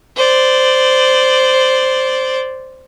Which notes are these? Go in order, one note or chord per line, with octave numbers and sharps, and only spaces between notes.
C5 D5